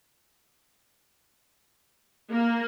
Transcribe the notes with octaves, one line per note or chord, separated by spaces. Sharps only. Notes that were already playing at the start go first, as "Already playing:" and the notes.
A#3